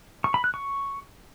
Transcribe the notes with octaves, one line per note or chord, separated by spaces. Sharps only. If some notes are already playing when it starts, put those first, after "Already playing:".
C#6
B5
F#6
C#6